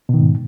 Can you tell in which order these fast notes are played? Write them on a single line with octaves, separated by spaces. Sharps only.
B2 D#3 G#2